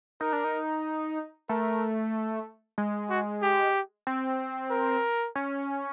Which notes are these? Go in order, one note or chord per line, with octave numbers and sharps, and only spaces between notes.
D#4 A#4
D4
D#4
A3 A#4
G#3
F#4
G4
C4
A#4
C#4